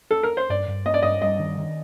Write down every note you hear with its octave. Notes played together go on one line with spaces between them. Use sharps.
A4
A#4
C5
G2 D5
G2
A#3 D#5
D5
G2 D#5
G2 D#5
D#3
D#3